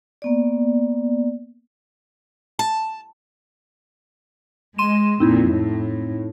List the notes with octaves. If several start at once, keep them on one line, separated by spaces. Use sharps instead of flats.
A#3 B3 D5
A5
G#3 C6 D#7 E7
F2 A#2 C4 D#4 E4
A2